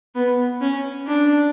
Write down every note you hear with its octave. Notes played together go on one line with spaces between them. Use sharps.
B3
C#4
D4